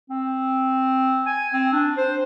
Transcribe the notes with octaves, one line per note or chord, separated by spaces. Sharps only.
C4
G#5
C4
D4
C5